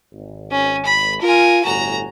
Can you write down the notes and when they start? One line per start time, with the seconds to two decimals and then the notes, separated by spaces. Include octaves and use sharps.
0.12 G#1
0.52 C#4
0.85 B5
1.22 F4 A#4 G#5
1.64 G1 A2 F#4 G#5 A#5